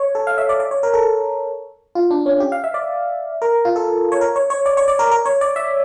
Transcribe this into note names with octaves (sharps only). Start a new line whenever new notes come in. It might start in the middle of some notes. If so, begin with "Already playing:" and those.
Already playing: C#5
A4
F5
E5
D5
D5
C#5
A#4
A4
F4
D4
C#4
G4
F5
E5
D5
A#4
F4
A4
C#5
A#4
C#5
C#5
D5
C#5
D5
A#4
A#4
C#5
D5
E5